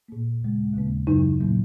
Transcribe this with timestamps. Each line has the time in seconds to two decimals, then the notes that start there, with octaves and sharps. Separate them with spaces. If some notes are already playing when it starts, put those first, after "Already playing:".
0.08 A#2 A#3
0.41 D#2 C#3 G#3
0.74 D#2 C#3 A#3
1.07 F#2 C#3 F#3 D#4
1.40 A#2 F#3 A#3